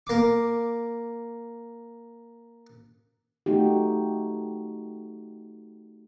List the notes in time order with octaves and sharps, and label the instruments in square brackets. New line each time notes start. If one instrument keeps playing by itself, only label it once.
[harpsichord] A#3 D6
[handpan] A3 D#4 F#4 G4